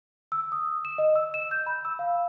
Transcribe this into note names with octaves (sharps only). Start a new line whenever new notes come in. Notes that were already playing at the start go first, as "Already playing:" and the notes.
E6
D#6
E7
D#5
E6
E7
G6
B5
E6
F5